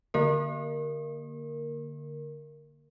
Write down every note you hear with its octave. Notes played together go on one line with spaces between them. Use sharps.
D3 A#3 A#4